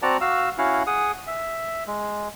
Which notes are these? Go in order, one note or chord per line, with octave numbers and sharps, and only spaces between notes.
C4 F#4 D5 F#5 A5 A#5
F#4 F5 E6
C#4 E4 F#4 F5 F#5
G#4 F#5 D#6
E5
G#3